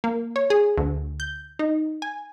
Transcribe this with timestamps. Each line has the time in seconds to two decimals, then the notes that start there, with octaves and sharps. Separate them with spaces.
0.04 A#3
0.36 C#5
0.50 G#4
0.77 D2
1.20 G6
1.59 D#4
2.02 G#5